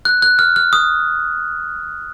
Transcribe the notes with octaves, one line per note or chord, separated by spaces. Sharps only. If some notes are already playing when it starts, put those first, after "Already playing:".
F#6
F#6
F6
F6
D#6